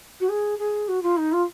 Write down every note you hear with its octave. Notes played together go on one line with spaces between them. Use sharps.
F#4
G#4
G#4
F#4
F4
D#4
F4